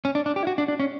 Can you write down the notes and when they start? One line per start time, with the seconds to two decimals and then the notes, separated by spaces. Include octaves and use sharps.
0.05 C#4
0.15 D4
0.26 D4
0.36 G4
0.43 E4
0.47 F#4
0.58 D4
0.68 D4
0.80 C#4